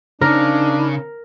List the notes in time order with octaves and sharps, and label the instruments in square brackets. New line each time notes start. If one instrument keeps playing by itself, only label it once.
[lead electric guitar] C#3 [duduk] D4 [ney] D#4 [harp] A#4